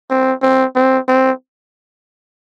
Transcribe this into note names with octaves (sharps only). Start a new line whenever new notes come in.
C4
C4
C4
C4